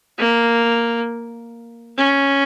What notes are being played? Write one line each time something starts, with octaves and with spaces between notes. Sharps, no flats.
A#3
C#4